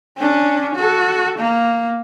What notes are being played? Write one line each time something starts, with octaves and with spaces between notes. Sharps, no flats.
C#4 D4
F#4 A4
A#3